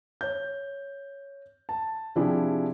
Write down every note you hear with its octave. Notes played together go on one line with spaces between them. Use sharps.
C#5 G6
A5
C3 F3 D4 E4 G4 G#4